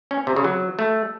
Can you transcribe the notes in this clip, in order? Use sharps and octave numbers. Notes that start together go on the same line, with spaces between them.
C#4
C3
C#3
F#3
A3